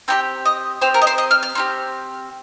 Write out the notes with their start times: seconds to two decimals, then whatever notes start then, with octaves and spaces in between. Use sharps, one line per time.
0.08 C4 D#4 G4 G5
0.45 D#5
0.81 C4 G4 C5
0.94 A#4
1.02 D#5
1.07 C5
1.18 D#5
1.31 F6
1.43 F6
1.55 C4 D#4 G4